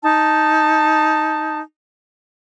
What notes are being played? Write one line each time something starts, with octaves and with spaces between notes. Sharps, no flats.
D#4 A5